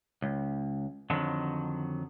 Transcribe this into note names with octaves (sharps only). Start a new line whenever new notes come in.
C#2
F2 D3 D#3 F#3